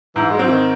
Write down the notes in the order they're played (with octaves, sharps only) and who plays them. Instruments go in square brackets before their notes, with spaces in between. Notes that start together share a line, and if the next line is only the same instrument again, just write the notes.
[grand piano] G#2 [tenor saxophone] E3
[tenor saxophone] G#3
[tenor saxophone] F#3 [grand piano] C4
[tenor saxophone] E3
D#3